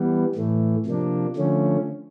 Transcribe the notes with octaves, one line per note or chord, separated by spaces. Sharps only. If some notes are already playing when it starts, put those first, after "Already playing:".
Already playing: E3 G3 B3
A2 E3 A3
C3 F3 A#3 D4
D3 F3 A3 C#4